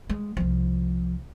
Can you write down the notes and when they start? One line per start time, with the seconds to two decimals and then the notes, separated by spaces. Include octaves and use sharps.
0.10 G#3
0.37 C2 F3